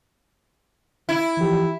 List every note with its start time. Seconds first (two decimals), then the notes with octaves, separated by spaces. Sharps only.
1.09 E4
1.37 E3 F3 G4